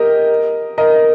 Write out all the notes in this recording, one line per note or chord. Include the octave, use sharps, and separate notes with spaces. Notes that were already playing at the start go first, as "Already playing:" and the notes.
Already playing: G4 A#4 D#5
A#4 D#5